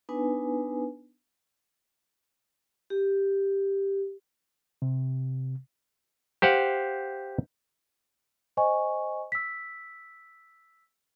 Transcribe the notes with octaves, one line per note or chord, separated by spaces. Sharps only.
B3 D4 D#4 B4 G#5
G4
C3
G4 C5 F5 F#5
C5 D#5 G#5 C#6
E6 B6